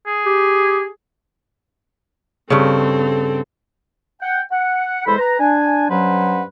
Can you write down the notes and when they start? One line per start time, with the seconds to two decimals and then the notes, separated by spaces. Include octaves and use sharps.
0.06 G#4
0.26 G4
2.50 G2 C#3 C4 A4
4.21 F#5 G5
4.51 F#5
5.06 E2 G#3 A4 C5 B5
5.19 B4 A#5
5.40 D4 G#5
5.90 G2 F#3 C#4 B4 C5 F#5